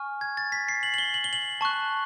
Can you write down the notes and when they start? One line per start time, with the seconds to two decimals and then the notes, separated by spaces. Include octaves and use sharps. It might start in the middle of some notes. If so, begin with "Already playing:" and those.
Already playing: G#5 C#6 F6
0.21 G#6
0.37 A6
0.52 B6
0.69 C7
0.83 F#7
0.94 F#7
0.98 G7
1.14 F#7
1.24 G7
1.33 F#7
1.61 A5 C#6 F#6